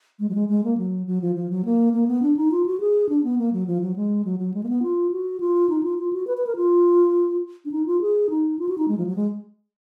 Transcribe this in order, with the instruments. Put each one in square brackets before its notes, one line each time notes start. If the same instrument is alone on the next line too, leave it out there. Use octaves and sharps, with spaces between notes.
[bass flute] G#3
F#3
G#3
G#3
A#3
F#3
F#3
F3
F3
F#3
A#3
A#3
B3
D4
D#4
F4
F#4
G#4
D4
B3
A#3
F#3
F3
F#3
G#3
F#3
F#3
G#3
A#3
B3
F4
F#4
F4
D#4
F4
F4
F#4
B4
B4
A#4
F4
D4
D#4
F4
G#4
D#4
F4
F#4
D#4
G#3
F3
F#3
G#3